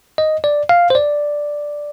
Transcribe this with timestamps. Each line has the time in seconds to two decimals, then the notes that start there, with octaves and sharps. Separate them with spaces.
0.18 D#5
0.44 D5
0.69 F5
0.90 C5
0.95 D5